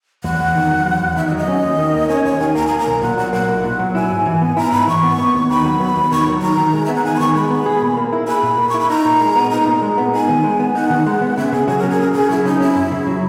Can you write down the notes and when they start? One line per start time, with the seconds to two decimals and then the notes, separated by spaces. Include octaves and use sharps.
0.24 E2 F#5
0.40 E2
0.55 D#3
0.71 F#3
0.85 E2
1.01 E2
1.16 D#3 E5
1.27 D#5
1.32 F#3
1.37 D#5
1.48 C#4
1.63 D#2
1.79 D#3
1.94 A#3
2.09 C#4 C#5
2.25 D#2 C#5
2.40 D#3 G#5
2.55 A#3 A#5
2.67 A#3 G#5
2.79 A#5
2.87 B1
3.02 A#2 F#5
3.17 F#3 F#5
3.33 A#3 F#5
3.48 B1
3.64 A#2
3.79 F#3
3.95 E4 G#5
4.10 G#2
4.26 E3
4.41 B3
4.57 E4 A#5
4.72 G#2 B5
4.88 E3 C#6
5.03 B3
5.18 B3
5.34 D#2
5.50 D#3 B5
5.65 F#3
5.80 B3
5.96 D#2
6.12 D#3 C#6
6.27 F#3
6.42 D#3 A#5
6.57 D#3
6.73 G#3
6.86 B3 E5
6.95 F#5
7.04 D#3 G#5
7.15 B5
7.20 D#3 C#6
7.35 G#3 B5
7.50 B3
7.66 G#4
7.82 A#2
7.97 A#3
8.13 E4
8.28 G#4 B5
8.43 A#2
8.58 A#3
8.69 C#6
8.74 E4
8.80 B5
8.90 D#4 A#5
9.05 A#2
9.21 G#3
9.36 B3
9.51 D#4 A#5
9.67 A#2
9.82 G#3
9.98 B3
10.13 D#4 G#5
10.29 D#3
10.44 G#3
10.59 B3
10.75 D#4 F#5
10.90 D#3
11.06 G#3
11.22 B3
11.37 C#3 E5
11.53 C#3 G#4
11.68 F#3 G#4
11.79 A#4
11.84 C#4
11.90 G#4
11.98 C#3 A#4
12.12 C#3 G#4
12.29 F#3 E4
12.45 C#4 D#4
12.60 C#4 E4
12.76 F#2
12.92 C#3
13.07 F#3